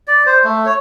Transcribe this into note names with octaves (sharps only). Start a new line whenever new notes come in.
D5
C5
A3
C#5